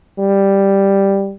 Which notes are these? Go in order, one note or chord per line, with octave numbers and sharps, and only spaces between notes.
G3